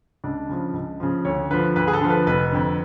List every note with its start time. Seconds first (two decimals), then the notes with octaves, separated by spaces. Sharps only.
0.24 C#2 D4
0.49 C#3 F3
0.74 C#2
1.00 C#3 F3
1.25 D2 C#5
1.50 D3 F3 B4
1.76 D2 B4
1.88 G#4
1.93 A4
2.01 D3 F3
2.10 B4
2.27 F1 B4
2.52 F2 D3